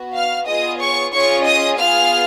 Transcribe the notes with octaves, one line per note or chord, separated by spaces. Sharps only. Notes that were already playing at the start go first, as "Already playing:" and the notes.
Already playing: B3 F#4
F5 F6
B3 F4 G#4 D#5 D#6
C#5 C#6
C#4 F4 G#4 C#5 C#6
D#5 D#6
B3 F4 G#4 F5 F6